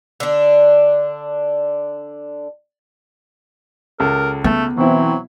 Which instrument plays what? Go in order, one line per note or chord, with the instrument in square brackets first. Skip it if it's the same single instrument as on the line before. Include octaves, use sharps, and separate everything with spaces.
[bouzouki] D3 D4
[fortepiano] C#2 A4 [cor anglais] A#4
[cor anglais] A3 [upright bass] B3
[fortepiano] B2 E4 [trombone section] E3 C4 [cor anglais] F#3